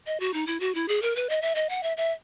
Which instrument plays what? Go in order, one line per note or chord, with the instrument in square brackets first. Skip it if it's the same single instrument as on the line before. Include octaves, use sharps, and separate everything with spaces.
[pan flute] D#5
F#4
D#4
E4
F#4
E4
G#4
A#4
B4
D#5
E5
D#5
F#5
E5
E5